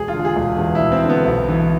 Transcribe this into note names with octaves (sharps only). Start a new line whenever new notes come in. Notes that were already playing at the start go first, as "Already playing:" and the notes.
Already playing: E1 G#4
F4
D3
G#4
E1
E2
E4
E1
C4
D3
B3
B1
E3